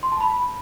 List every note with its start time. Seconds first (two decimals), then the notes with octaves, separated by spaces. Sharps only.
0.03 C6
0.12 A5
0.21 B5